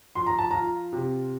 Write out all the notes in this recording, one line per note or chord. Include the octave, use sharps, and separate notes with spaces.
F3 C6
A#5
A5
F4 A#5
C3